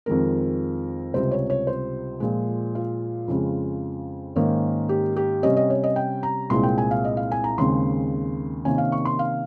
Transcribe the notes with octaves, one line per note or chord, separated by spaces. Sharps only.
F2 D#3 G#3 C4 A#4
C#2 C3 G3 C4 C5
C#5
C#5
C5
A#2 F3 G#3
F4
F2 C#3 G#3
G#2 D#3 A#3 C#4
G4
G4
C3 G3 C#4 D#5
D#5
C#5
D#5
G5
A#5
C2 A#2 G#3 C4 C6
G5
G#5
F5
D#5
F5
G#5
A#5
D#2 C#3 G#3 C4 C6
C3 D#3 A#3 C#4 G#5
F5
C#6
C6
F5